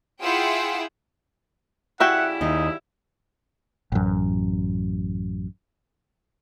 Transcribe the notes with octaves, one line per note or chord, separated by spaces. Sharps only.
E4 F4 G#4 F#5 G5 E6
C#3 G3 E4 F#4 E5 F#5 G5
D#2 D#4 D#6
A1 F#2